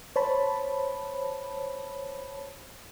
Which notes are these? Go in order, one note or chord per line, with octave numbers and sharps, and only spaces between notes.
C5 C#5 A5 B5